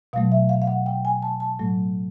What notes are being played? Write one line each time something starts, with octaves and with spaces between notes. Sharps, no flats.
B2 F#3 A3 F5
E5
F5
F5
F#5
G5
G#5
A5
A5
A2 F#3 A3